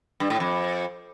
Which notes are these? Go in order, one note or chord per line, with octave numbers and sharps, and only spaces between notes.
G2
A2
F2